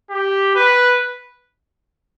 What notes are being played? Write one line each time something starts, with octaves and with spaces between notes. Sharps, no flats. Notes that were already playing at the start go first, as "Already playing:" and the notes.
G4
B4